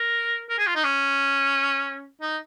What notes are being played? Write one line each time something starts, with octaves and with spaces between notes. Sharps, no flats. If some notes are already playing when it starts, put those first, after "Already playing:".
Already playing: A#4
A#4
G#4
F4
D#4
C#4
D#4